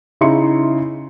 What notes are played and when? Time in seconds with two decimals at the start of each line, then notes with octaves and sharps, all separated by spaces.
0.21 C#3 D#4 E4 E5 C6 C#7